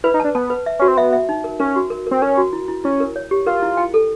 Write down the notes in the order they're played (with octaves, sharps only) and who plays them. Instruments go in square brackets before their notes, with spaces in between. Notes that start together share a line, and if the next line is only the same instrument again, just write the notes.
[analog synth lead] E4 [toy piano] B4
[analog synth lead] D#4
[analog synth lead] D4 [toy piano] A5
[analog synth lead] B3 [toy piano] A5
[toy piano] B4
E5
[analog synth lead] C#4 [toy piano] F#4
[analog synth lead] C4
[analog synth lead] B3 [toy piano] E5
[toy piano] E5
D#4
A#4
[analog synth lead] C#4 [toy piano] A#4
[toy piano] F#4
A#4
[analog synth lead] C4 [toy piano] A#4
[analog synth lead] C#4 [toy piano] A#4
[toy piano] F#4
E4
E4
[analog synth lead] C#4 [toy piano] E4
[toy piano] A#4
C#5
G4
[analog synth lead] F4 [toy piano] A#4
[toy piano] E4
G5
A4